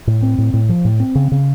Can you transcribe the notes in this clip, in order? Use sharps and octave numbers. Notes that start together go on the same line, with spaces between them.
A2
C4
A2
A2
F3
A2
C4
C#3
C#3